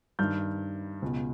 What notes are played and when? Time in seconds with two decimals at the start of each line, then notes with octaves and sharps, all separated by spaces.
0.19 G2 D#3 F6 G6
1.02 C#2 B2